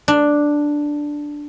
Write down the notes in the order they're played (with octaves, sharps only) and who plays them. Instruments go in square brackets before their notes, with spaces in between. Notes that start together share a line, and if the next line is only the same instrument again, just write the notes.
[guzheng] D4